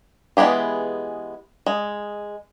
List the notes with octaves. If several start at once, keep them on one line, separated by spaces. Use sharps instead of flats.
E3 G#3 B3 G4 G#4
G#3